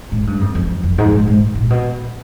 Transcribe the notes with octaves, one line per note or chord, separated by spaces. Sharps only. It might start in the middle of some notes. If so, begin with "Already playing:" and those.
G#2
G2
F2
F2
F2
G#2
G#2
G#2
A#2
B2